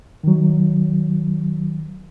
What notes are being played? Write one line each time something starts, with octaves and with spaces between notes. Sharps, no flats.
D#3 F#3